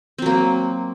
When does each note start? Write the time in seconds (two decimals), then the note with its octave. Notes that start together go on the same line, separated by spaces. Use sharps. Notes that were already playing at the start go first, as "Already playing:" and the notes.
0.18 C4
0.22 F#3
0.26 A#3